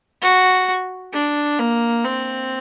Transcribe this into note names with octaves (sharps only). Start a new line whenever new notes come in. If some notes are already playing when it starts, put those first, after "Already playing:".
F#4
D4
A#3
C4